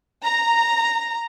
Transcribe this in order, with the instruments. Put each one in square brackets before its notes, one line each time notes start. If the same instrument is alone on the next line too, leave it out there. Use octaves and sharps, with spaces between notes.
[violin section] A#5